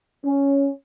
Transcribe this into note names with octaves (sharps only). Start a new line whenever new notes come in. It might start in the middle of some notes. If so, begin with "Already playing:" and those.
C#4